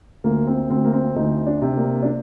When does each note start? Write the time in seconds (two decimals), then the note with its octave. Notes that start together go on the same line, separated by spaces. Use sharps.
0.24 D2 A#3
0.47 C4
0.70 D2 C4
0.85 A#3
0.93 C4
1.16 D2 D#4
1.47 D4
1.62 C3
1.77 A#3
2.02 D4